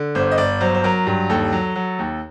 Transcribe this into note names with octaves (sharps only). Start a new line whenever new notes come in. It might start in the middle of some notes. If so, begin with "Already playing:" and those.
Already playing: D3
G1 C5
D#5
G1 D5
F#3 C5
C5
F#3 A#4
G2
D#2 A4
F#3
F#3
D#2